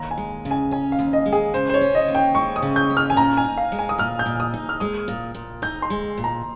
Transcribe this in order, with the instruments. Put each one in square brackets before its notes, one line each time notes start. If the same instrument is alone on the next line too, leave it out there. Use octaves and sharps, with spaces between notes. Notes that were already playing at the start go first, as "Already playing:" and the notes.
Already playing: [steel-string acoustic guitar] D#2 [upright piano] A#5
[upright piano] G#5
[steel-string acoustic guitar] G#3
C#3
[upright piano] G#5
[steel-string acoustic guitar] C#4 [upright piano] G#5
[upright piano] F5
[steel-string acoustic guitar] D#2
[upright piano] D#5
[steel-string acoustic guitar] G#3
[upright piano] G#4
[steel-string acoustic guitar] C#3 [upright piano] C5
[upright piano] C5
C#5
[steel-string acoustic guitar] C#4
[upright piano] D#5
[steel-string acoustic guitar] D#2
[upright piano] G5
[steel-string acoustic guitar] G#3 [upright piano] C#6
[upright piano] D#6
[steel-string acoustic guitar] C#3
[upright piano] G6
[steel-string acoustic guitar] C#4
[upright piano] F6
G#5
[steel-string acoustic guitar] A#2 [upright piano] A#5
[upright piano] G#5
[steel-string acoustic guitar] D#4
[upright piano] F5
[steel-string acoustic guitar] G#3
[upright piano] G#5
D#6
[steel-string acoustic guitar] A#2 [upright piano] F6
[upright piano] G6
[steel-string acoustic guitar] A#2
[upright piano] D#6
[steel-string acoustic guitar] D#4
[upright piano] F6
[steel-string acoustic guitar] G#3 [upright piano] D#6
[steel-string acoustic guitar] A#2
A#2
[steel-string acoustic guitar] D#4 [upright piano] G6
[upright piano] C6
[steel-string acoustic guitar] G#3
A#2
[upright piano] A#5